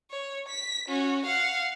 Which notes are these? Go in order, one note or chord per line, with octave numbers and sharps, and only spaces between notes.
C#5
B6
C#4 F#4
F5 F#5